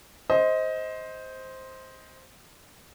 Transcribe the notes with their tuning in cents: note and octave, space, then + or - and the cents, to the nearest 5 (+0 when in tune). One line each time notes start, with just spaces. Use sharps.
C5 +0 D#5 +20